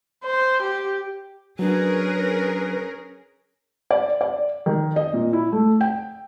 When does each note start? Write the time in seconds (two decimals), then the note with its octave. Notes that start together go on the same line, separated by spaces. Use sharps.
0.24 C5
0.63 G4
1.59 F#3 C#4 D4 G#4 A#4 B4
3.90 D5
4.21 D5
4.66 D#3
4.96 D#5
5.13 A#2
5.33 E4
5.52 A3
5.81 G5